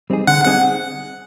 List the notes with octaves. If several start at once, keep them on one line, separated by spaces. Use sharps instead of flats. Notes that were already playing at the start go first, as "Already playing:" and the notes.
G3 C4 D#4 G#4
D3 F#5
G3 C4 D#4 G#4 F#5